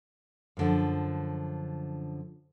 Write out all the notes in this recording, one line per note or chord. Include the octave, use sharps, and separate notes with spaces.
F#2 D3 F3